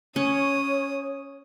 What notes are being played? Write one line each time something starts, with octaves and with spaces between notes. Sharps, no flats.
C#4 C#5 D#6